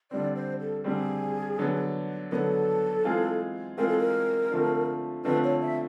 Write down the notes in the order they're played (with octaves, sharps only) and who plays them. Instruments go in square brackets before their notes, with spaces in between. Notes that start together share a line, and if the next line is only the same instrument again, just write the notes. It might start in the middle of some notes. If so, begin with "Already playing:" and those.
[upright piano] D3 G3 C4 [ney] D5
[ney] C5
A4
[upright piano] D3 G3 C4 [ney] G#4
[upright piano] D3 F#3 B3
[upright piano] D3 F#3 B3 [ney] A4 A#4
[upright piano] E3 G#3 C4 F4 G#4
[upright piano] E3 G#3 C4 F4 G#4 [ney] A#4
[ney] A4
A#4
[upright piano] D3 F3 A3 C4
[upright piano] D3 F3 A3 C4 [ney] B4
[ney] C#5
E5